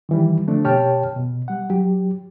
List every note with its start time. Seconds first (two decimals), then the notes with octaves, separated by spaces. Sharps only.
0.09 D#3 E3 G3
0.47 D3 F3 A3 C4 D4
0.64 B2 G4 C#5 G5 A5 F6
1.16 B2
1.48 G3 F#5
1.70 F#3 G4